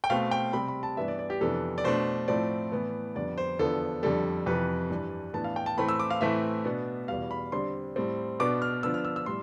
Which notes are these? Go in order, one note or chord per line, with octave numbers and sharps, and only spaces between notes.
G5
B2 A3 C4 F5
G5
C3 G3 C4 B5
B5
A5
G2 E3 B3 D4 E5
D5
D5
G4
F2 C3 E3 B3 D4 A4
D5
B2 A3 D4 C5
A2 F3 A3 C4 D5
A2 E3 B3
F2 D3 G3 B3 D4 D5
C5
E2 D3 F3 B3 A4
F2 D3 G3 A4
F2 C3 E3 B4
G2 E3 G3 D4
A2 E3 B3 D4 A5
F5
G5
A5
A2 E3 A3 C4 B5
E6
D6
F5
A2 E3 A3 C4 E5
B2 B3 D4
E2 B2 G3 F5
B5
D3 G3 C4 C6
A2 G3 C4
B2 B3 D4 D6
F6
D3 F3 B3 D4 E6
F6
E6
E6
A2 G3 C6